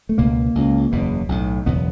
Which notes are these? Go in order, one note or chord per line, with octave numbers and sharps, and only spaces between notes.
A3
C#2 B2 A#3
C#2 C#3
F#1 E2 B2
B1 A2
F#1 E2 B2 B3